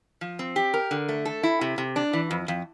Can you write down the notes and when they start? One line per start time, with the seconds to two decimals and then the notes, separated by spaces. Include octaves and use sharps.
0.21 F3
0.39 C4
0.56 G4
0.74 A#4
0.91 D3
1.09 A3
1.25 A4
1.43 E4
1.61 C3
1.78 C3
1.96 D4
2.13 E3
2.31 F2
2.48 F2